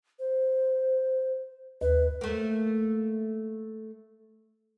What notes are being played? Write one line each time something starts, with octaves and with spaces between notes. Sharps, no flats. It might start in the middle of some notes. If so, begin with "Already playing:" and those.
C5
D#2 B4
A3 A#3